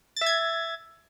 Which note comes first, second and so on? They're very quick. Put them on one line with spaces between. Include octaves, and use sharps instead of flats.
A6 E5 G#6